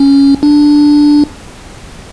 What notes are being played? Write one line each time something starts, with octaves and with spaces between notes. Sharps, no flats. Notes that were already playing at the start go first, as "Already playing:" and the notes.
Already playing: C#4
D4